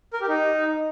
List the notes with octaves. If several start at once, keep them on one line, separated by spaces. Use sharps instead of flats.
A#4
G4
D#4